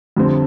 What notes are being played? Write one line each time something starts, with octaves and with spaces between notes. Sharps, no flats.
F2 D3 G3 C4